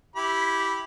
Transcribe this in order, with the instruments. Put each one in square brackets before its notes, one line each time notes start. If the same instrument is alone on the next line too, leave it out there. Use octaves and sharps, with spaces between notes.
[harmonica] E4 G4 B5